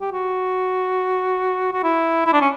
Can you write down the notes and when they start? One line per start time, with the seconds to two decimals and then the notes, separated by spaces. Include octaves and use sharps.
0.01 G4
0.12 F#4
1.72 F#4
1.84 E4
2.26 E4
2.33 D4
2.41 C#4